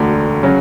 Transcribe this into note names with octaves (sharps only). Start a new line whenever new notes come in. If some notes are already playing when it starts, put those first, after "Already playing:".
Already playing: E1 D2 D3
C#3 F#3 C#4